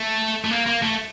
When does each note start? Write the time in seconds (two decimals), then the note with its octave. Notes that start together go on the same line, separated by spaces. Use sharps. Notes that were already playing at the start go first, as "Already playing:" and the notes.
Already playing: A3
0.45 A3
0.51 A#3
0.66 A#3
0.82 A3